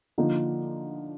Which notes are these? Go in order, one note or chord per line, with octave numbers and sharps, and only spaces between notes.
D3 F3 A#3 D#4